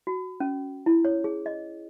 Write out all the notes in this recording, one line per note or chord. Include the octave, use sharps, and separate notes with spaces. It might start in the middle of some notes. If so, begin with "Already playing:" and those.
F#4
C#4
E4
C#5
G#4
D#5